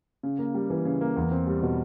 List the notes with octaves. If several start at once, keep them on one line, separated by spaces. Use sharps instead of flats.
C#3
A#3
G3
E3
C#3
A#3
E2
C4
G3
B2